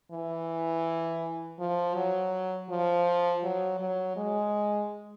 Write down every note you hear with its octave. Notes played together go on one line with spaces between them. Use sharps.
E3
F3
F#3
F3
F#3
F#3
G#3